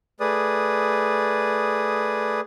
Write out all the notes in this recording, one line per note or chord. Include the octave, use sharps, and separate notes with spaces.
A3 G#4 B4 D5 D#6